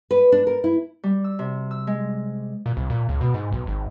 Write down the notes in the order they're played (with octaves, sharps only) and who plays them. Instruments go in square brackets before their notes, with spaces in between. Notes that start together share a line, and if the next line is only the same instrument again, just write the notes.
[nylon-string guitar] B4
D4
A#4
E4
[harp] G3
E6
C3
E6
G#3
[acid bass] A#2
C2
A#2
C#2
B2
G#2
B1
G#1